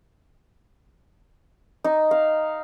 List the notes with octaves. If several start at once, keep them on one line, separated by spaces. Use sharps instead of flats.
D#4
F5